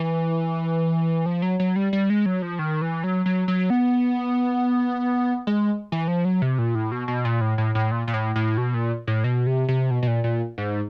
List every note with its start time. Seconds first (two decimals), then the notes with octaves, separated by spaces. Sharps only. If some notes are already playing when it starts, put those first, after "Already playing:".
Already playing: E3
1.26 F3
1.42 F#3
1.60 F#3
1.76 G3
1.93 G3
2.10 G#3
2.26 F#3
2.42 F3
2.59 D#3
2.82 E3
3.04 F#3
3.26 F#3
3.48 F#3
3.70 B3
5.47 G#3
5.92 E3
6.08 F3
6.25 F#3
6.42 C3
6.58 A#2
6.75 A2
6.92 B2
7.08 B2
7.25 A#2
7.41 A2
7.58 A2
7.75 A2
7.91 A#2
8.08 A#2
8.14 A2
8.36 A2
8.58 B2
8.74 A#2
9.07 A2
9.24 B2
9.47 C3
9.68 C3
9.91 B2
10.03 B2
10.07 A#2
10.24 A#2
10.58 G#2